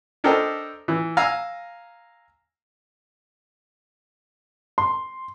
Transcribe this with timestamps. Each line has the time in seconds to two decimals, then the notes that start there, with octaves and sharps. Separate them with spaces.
0.24 D4 A4 A#4 C5 D#5 G5
0.88 E3
1.17 F5 G#5 A#5 E6
4.78 C6